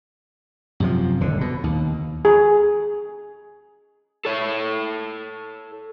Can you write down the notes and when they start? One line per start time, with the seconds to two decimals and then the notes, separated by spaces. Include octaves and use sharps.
0.80 F#2 C3 F3
1.20 D#1 D3
1.41 B2
1.64 D#2
2.25 G#4
4.25 A4 C#5